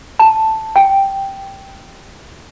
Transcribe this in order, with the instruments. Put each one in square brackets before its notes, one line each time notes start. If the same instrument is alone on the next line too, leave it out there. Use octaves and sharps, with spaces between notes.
[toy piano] A5
G5